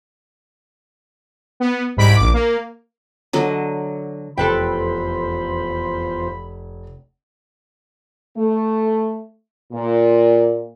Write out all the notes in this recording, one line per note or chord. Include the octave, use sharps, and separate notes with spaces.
B3
C2 G#2 B5 B6 D7
A#1 D6
A#3
D3 F#3 D#5
F1 E2 F4 A4 B4 C5 G5 B5
A3
A#2